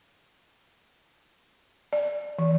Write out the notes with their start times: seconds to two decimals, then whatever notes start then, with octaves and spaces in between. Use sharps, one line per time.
1.93 D5
2.39 E3